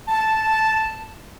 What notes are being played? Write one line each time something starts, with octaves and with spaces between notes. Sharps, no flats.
A5